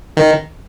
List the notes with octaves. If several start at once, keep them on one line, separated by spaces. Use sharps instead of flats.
D#3